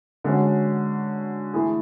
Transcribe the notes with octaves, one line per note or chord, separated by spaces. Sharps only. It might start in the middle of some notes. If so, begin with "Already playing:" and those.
D3 G#3 C#4 F#4
E3 A3 E4 G#4